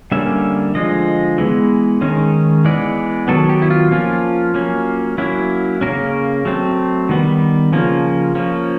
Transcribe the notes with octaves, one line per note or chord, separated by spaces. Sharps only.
D3 G3 A#3 C#4 E5
D3 F3 G#3 D#5
E3 G#3 B3
D#3 G#3 C#4
E3 G#3 B3 D5
D#3 F#3 B3 A4
G4
E4
F4
F3 A#3 C#4 F4
F#3 A#3 C#4
F#3 A#3 C#4 E4
C#3 F3 A#3 C#4 A#4
F#3 A3 C4
D#3 G3 B3
C#3 F3 A#3 C#4
F3 A#3 C#4